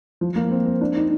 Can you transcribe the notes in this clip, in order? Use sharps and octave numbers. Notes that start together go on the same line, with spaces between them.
F3
A#3
C4
C4
D4
D#4